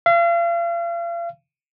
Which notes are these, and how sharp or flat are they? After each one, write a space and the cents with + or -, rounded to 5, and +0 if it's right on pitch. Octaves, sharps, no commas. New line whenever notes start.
F5 -40